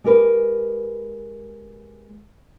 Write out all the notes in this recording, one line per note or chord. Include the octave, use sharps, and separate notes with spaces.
G#3 G4 A#4 B4